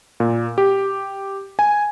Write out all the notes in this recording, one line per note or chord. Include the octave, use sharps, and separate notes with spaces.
A#2
G4
G#5